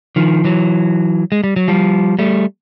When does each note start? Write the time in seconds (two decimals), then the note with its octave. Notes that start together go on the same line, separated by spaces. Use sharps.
0.16 D#3 F3
0.45 E3 F#3
1.32 G#3
1.44 G3
1.56 F#3
1.68 F3 G3
2.19 G3 A3